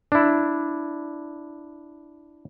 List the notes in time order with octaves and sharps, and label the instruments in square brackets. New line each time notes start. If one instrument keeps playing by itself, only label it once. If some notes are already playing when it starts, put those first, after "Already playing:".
[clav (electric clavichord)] D4 E4